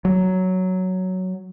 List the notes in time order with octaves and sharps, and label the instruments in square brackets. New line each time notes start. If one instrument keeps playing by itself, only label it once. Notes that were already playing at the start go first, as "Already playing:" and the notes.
[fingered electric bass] F#3